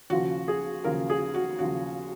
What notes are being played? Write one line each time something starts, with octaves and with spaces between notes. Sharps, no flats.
D#2 C#3 F3 F#4
G#4
D#2 C#3 F3 A#4
G#4
F#4
D#2 C#3 F3 F#4